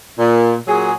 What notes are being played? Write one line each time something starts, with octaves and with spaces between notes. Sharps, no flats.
A#2
A#2 F#3 G#4